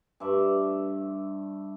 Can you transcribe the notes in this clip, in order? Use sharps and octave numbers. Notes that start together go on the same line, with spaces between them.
G2 A3 D5 E5